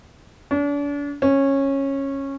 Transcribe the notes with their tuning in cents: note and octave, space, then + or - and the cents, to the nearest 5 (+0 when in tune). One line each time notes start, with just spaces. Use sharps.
D4 -40
C#4 -15